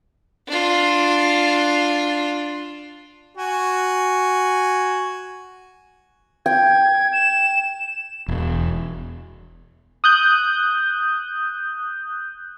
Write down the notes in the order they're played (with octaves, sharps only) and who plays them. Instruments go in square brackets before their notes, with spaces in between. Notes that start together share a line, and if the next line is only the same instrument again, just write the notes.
[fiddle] D4 F4
[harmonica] F#4 G#5
[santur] G5 [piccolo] G#6
[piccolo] E7
[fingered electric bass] E1
[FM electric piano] D#6 F#6 G6